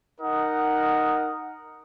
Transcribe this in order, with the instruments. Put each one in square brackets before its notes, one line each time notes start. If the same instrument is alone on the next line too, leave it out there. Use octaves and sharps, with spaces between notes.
[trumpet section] D#4 A#4 D#5 F#5